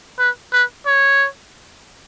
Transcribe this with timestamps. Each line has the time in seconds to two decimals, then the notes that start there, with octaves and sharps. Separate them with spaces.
0.19 B4
0.53 B4
0.86 C#5